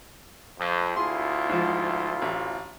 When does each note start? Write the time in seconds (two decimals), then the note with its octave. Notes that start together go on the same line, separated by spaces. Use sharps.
0.59 F2
0.96 D2 E4 F4 G#4 C6
1.49 G#2 F3
2.22 A1